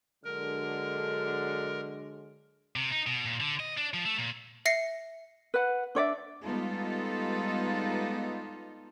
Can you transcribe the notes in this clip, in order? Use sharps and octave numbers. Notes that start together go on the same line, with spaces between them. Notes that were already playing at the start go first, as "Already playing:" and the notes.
D3 F#3 G#3 A#4
C3
D#4
B2
A#2
D3
D#5
D4
F3
A3
A#2
E5 A#6 C7 C#7
B4 F#5
D4 C#5 D5 E5
G3 G#3 B3 D#4 F4 A4